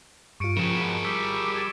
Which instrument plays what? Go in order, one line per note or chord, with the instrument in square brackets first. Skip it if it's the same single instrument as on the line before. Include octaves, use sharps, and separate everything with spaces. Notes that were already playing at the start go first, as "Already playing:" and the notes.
[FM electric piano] G2 F4 [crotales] C#6 C#7 D7
[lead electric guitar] C#3 [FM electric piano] F3 [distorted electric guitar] G#4 A#4 [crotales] C#7 E7
[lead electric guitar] F2 B2
[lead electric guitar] G3 [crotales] D#6 E6 B6
[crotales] G#6 A6 E7